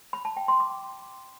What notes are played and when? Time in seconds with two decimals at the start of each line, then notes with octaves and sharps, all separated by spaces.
0.13 B5
0.25 A5
0.37 G5
0.48 C6
0.60 D6